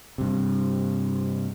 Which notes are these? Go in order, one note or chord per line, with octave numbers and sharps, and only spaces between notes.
G2 C3